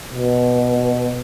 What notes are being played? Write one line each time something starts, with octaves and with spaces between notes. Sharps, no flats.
B2